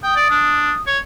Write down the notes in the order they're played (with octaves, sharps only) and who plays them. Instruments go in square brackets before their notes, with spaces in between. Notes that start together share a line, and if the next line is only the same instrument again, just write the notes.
[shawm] G5 [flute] D#6
[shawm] D5
D4
C#5